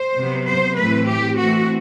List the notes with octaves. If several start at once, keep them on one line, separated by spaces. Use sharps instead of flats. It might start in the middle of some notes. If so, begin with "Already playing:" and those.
Already playing: C5
C3 F#3 B3
C5
A2 E3 A3 C4 B4
G4
E3 A3 C4 F#4